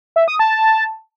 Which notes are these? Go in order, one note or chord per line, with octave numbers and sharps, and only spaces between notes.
E5
D#6
A5